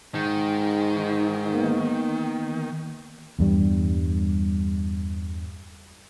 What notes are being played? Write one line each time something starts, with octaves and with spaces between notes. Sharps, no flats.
G#2 D#3
A#3 B3
E2 G2 G3